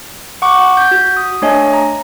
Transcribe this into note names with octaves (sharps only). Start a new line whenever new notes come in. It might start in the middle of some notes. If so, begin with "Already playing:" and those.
F#5 C#6 D6
G6
F#4
D#6
A3 D4 C#5 D#5 G#5
A#5